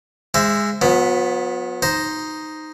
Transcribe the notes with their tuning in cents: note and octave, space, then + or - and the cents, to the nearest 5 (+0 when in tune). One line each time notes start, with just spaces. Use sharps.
G#3 -15 C5 +0 E5 +15
F#3 -45 B3 +0
D#4 +0 C5 +0